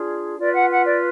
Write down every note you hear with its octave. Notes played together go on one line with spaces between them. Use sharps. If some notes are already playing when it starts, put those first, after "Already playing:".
Already playing: D4 F4 G#4
F4 B4 D5
F#5
F#5
D5